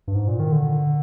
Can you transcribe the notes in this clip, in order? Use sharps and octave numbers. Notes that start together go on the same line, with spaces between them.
G2
G#2
A#2
D#3
D3